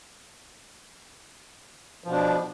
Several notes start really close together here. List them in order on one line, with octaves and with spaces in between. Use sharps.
F3 B2 D4